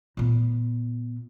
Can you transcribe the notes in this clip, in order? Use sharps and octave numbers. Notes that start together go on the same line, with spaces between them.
A#2 B3